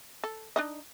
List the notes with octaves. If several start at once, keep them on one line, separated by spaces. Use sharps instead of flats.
A4
D4 D#4 D#5